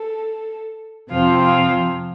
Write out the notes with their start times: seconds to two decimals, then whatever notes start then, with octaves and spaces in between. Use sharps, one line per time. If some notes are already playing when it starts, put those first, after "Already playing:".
Already playing: A4
1.11 F2 C3 F3 C4 F4
1.42 F4